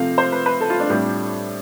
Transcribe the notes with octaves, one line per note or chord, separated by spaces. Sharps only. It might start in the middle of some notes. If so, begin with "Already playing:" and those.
Already playing: C3 F3 A3 C4 F5
C5
B4
B4
A4
F4
D4
A2 G3 C4